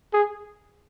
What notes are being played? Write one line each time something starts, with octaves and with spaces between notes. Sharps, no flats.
G#4